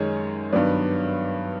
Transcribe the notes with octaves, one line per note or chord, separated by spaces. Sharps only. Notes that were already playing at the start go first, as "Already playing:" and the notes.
Already playing: F#2 D#3 G#3 C#4 C#5
G2 D#3 F#3 B3 D5